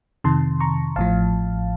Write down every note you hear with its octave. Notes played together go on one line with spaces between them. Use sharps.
F2 C3 D#3 A5 C6
A#5 C#6
A1 A2 F3 F5 A5